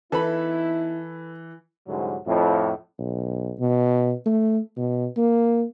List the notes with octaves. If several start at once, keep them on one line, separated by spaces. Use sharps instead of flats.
E3 B3 D#4 E4 A4 B4 B5
C2 G#2 D3 F#3
F2 A2
B1
B2
A3
B2
A#3